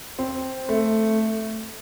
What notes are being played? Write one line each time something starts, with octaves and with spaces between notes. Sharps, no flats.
C4
A3